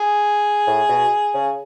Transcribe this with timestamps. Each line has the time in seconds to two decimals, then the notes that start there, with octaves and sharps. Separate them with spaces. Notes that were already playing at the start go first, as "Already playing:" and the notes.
Already playing: G#4
0.67 A2
0.89 B2
1.34 C#3